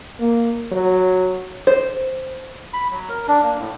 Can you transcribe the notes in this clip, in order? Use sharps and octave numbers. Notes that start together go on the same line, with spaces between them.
A#3
F#3
C5
B5
F#3
A#4
D4
A#3
A2